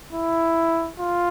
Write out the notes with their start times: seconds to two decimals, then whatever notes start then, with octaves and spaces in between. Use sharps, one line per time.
0.13 E4
1.00 F4